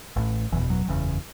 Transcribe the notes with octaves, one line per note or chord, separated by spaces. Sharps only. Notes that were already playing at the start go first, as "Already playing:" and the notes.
A1 A2
F#1 E2 B2 E3
F#3
F#1 E2 C#3